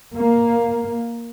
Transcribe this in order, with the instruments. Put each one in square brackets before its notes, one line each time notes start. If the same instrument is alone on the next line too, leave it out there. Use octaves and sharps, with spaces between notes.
[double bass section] A#3